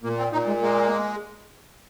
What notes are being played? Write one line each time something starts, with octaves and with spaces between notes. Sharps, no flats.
A#2 A#3
C4
A#2 D#4
G#3
G#3 A#3